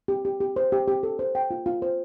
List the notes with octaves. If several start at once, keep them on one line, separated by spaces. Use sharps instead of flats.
G4
G4
G4
C5
G4
G4
A4
C5
G5
F4
F4
C5